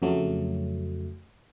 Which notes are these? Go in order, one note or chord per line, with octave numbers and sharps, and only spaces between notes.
F2 C#3 F#3 A3